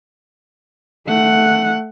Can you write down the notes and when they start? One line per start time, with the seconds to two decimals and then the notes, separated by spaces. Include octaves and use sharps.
1.07 A3 F#5